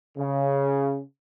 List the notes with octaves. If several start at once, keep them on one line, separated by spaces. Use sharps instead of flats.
C#3